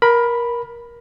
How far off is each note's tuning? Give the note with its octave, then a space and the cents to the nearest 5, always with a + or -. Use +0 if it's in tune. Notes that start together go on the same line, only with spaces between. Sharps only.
A#4 +20 B5 +0